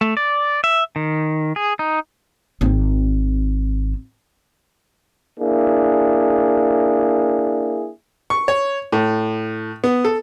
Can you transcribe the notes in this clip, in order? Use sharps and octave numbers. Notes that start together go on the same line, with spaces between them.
A3
D5
E5
D#3
G#4
D#4
G#1 C4
A#3 D4 E4 G#4
C#6
C#5
A2
B3
A4